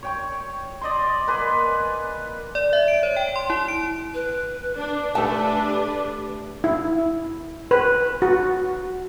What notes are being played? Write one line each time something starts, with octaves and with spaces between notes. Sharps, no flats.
C#5 G5 C#6
D5 D#5 C6
A#3 B4 G#5 C6
D5
E5
D7
C#5
G5
C6
E4
D7
B4
D4
A3 D4 G4 A4 B4 A5
E4
B4
F#4